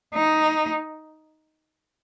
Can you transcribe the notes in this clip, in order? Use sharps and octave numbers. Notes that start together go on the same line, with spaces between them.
D#4